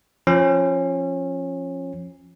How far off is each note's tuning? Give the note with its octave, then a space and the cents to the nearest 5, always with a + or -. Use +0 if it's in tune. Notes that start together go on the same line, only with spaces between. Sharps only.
F3 +0 C#4 -25